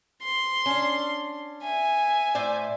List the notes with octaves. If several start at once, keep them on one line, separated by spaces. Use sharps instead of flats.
C6
C#4 D4
E5 G#5
A2 C5 D5